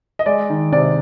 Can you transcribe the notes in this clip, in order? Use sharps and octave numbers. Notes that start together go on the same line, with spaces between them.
D#5
G#3 D5
D#3
C3 D5